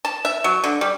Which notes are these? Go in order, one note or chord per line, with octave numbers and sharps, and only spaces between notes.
A5
E5
F#3
D3
G3